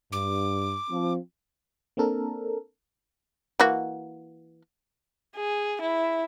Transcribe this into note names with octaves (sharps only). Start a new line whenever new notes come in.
G2 D6
F3 C4
A#3 C4 D4 A4 A#4
E3 A#3 F#4
G#4
E4